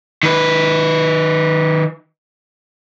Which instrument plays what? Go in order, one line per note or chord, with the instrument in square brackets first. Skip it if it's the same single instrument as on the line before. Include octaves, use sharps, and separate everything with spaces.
[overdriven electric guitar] D#3 B4